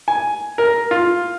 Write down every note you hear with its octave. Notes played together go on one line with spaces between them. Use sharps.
G#5
A#4
F4